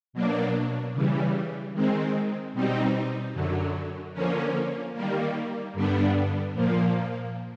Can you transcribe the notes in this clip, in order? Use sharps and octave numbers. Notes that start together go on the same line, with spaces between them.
B2 F#3 A#3 D4
C#3 E3 G3
D#3 G#3 C4
B2 G3 C4 D#4
F#2 D3 F#3
D3 F3 A#3 C#4
D#3 G3 A#3
G2 D3 G3 B3 D4
A#2 F3 A#3